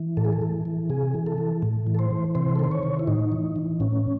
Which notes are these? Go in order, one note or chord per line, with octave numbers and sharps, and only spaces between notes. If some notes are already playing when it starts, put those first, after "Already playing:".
Already playing: E3
A2 A4
G#4
A4
E3
E3
C3 G#4
E3
A4
E3
A2
E3
A4
C5
E3
C3 C5
A4
D#3 C5
C#5
D#3
E4
A2 D#4
E3
E3
A2 C#4